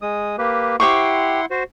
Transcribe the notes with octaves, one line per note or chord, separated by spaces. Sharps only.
G#3 D#6
A#3 G4 B4
E4 G4 C5 F#5 C6 C#6
F#4 C5